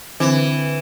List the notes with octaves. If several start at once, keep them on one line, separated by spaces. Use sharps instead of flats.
D3 E3 C4 B4